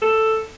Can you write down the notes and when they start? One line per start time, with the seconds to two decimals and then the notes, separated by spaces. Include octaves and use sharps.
0.02 A4